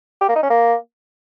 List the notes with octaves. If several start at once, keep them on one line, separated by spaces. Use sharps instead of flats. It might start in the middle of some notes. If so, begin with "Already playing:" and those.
G4
A#3
D#4
C#4
A#3